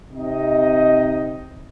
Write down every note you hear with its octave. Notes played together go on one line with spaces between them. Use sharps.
C3 D#4 D#5